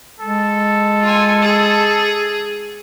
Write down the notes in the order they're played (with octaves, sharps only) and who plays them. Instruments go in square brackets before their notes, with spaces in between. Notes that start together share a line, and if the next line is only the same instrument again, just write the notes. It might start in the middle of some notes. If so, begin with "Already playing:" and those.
[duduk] G#3 [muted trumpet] A4
[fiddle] F4 G#5
G#4